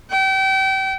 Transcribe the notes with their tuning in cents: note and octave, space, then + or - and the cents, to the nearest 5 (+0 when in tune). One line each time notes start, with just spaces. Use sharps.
G5 -35